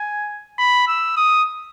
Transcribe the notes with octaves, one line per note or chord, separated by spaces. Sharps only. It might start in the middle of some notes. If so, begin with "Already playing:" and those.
Already playing: G#5
B5
E6
D#6